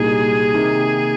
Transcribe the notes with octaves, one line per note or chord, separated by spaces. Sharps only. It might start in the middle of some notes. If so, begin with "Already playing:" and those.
Already playing: C2 A#2 G3 A#3 D#4 G#4
C3 D#3 A#3 D#4 G4